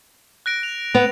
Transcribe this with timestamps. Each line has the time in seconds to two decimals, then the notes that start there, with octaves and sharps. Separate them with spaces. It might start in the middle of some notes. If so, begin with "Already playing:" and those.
0.46 F#6 A#6 D7
0.63 F7
0.95 B3 F7